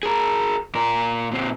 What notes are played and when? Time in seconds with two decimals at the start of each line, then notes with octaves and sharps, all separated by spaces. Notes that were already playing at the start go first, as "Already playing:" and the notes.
0.03 G#4 A#4
0.75 A#2 A#4
1.31 A#2 C4